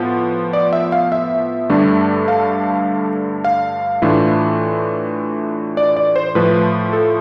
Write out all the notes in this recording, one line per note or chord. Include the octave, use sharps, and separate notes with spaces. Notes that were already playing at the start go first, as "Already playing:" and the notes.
Already playing: A2 F3 B3
D5
E5
F5
E5
G2 D3 A3 D4
F5
F5
A2 E3 A3 D4 F4
D5
D5
C5
A2 F3 A3 B4
A4